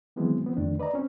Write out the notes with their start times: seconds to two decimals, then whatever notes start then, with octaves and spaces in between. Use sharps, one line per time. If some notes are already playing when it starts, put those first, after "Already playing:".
0.16 D#3 E3 F#3 G#3 B3 C4
0.44 F3 B3 C4
0.57 F2 D3 D#3 A3 D4
0.80 B4 D5 D#5 A#5
0.94 C4 C#4